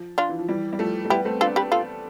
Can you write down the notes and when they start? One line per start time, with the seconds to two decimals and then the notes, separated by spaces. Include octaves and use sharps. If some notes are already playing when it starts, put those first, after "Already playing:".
Already playing: F3
0.18 D4 F4
0.29 E3
0.39 F3
0.49 E3 G3
0.73 G3
0.79 F3 A3
1.05 A3
1.10 G3 B3 E4 G4
1.25 A3 C4
1.41 B3 D4 F4 A4
1.56 G4 B4
1.72 F4 A4